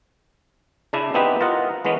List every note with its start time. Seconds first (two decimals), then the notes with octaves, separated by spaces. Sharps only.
0.93 C#3 D4 E4
1.14 B3 C4 D#4 E4 G4 B4
1.41 F4 A#4 D#5 F#5
1.85 E3 G#3 B3 C#4